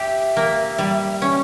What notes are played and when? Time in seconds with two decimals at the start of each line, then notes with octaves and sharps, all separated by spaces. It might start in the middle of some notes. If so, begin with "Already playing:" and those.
Already playing: G4 E5
0.37 A#3
0.78 G3
1.22 C#4